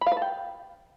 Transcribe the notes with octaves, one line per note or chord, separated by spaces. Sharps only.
B5
F5
B4
A5
G5